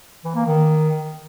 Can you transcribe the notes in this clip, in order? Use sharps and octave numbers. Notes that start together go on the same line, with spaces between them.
E3
A#3
D#3